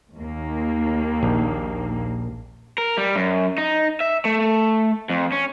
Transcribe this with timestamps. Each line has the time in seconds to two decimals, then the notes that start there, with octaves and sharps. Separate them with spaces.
0.16 D#2 A#3
1.23 A#1
2.78 A#4
2.98 G3
3.16 F#2
3.58 D#4
4.00 E5
4.25 A3
5.10 F2
5.32 C#4